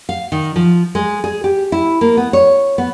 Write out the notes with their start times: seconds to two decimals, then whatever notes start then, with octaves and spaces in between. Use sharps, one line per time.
0.09 F5
0.32 D#3
0.56 F3
0.95 G#3
1.24 G#4
1.44 G4
1.72 E4
2.01 A#3
2.17 B3
2.33 C#5
2.78 B3